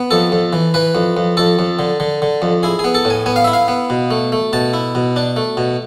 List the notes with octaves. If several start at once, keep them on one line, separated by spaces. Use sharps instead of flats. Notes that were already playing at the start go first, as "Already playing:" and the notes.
Already playing: B3
F2 A4
F2
E3
E3 B4
F2
F2
F2 A4
F2
D3
D3
D3
F2
E4 G#4
G#4
B3
A4
A2
G#5
B3 G#5
F5
E4 E5
F5
B3
B2
A3
A3
B2 A5
E4
B2
D4
A3
B2